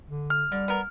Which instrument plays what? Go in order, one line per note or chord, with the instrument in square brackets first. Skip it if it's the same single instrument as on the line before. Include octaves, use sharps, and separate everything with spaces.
[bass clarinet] D3
[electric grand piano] F6
[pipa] D3 [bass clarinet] G3
[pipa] B3 A#4